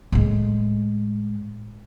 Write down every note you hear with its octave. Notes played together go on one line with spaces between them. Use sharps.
A2 G#3